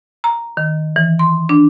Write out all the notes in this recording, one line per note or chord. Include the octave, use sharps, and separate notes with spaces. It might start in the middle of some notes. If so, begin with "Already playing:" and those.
A#5
D#3
E3
C6
D4